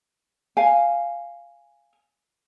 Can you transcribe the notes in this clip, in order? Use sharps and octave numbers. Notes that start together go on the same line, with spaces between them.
F5 G#5